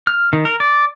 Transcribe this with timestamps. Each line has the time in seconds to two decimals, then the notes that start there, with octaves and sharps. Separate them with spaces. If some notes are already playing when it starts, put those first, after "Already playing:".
0.07 F6
0.33 D#3
0.45 A#4
0.60 D5